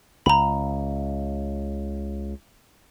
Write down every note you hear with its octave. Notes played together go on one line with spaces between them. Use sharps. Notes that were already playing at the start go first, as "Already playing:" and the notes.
C#2 A#5 B5